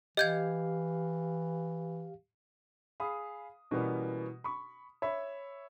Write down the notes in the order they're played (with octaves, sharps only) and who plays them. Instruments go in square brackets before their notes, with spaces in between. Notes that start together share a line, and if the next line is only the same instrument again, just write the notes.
[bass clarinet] E3 [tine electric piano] G4 F5 [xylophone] D#5 G6 G#6
[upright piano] G#4 F5 B5 D#6
B2 E3 G3 A#3 B3 C#4
B5 C#6
C#5 E5 B5